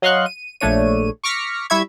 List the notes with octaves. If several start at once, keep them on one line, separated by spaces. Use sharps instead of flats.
F#3 D#5 F5 C6 C#6 F#6
D#7
A#1 A3 D4 C#5 D#7
C#6 D6 F6 A#6 B6 C#7
G3 E4 E5 C#6 G#6